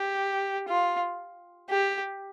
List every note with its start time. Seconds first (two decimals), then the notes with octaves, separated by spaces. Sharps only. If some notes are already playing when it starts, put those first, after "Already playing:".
Already playing: G4
0.68 F4
1.69 G4